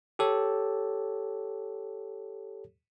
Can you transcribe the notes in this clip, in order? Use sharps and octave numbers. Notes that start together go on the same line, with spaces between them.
G4 A4 C#5